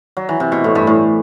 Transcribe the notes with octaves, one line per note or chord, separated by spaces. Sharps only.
F#3
E3
C3
B2
A2
G2
A2